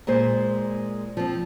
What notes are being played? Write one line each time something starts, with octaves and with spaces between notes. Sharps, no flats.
A#2 G#3 C5
F3 C4